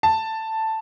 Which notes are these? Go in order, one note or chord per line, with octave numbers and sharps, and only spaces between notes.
A5